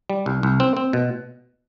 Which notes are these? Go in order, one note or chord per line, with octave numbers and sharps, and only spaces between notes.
G3
C2
C2
C4
C4
B2